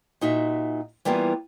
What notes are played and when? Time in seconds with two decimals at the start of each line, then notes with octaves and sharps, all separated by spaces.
0.21 A#2 D#4 F#4 E5
1.05 E3 G3 A#3 B3 F4